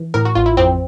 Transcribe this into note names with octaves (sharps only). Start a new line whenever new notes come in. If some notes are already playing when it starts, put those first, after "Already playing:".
Already playing: E3
A2 A#4
F#4
A1 F4
E4
F2 C4